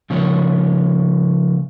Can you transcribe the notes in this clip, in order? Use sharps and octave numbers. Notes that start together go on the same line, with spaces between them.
C#3 F3 A#3 C#5